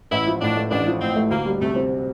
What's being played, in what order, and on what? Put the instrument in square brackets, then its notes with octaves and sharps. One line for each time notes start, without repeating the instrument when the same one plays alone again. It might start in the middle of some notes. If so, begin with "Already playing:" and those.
[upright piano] A1 [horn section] E4
[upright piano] F3
[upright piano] A2 [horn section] D4
[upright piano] A3
[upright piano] A1 [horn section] D4
[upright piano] F3
[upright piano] A2 [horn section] C4
[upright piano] A3
[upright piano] D2 [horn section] A#3
[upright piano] G3
[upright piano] C3 [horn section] A3
[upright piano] C4